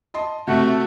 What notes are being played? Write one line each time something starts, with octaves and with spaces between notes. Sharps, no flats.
D#5 A5 C6
C3 A3 F#4